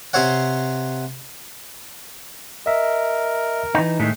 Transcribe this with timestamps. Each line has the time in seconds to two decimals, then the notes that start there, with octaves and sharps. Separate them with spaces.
0.13 C3 C4 C5 C#5 F#5
2.66 A#4 D#5 E5
3.75 E3 D#4
4.00 A2 D#3 G#3 E5